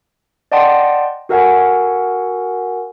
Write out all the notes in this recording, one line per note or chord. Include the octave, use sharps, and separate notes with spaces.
D5 D#5 F#5 G5 A5 C6
F#4 A4 A#4 F5 F#5 G#5